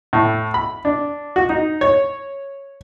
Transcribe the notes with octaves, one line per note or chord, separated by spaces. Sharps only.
A2
B5
D4
F#4
D#4
C#5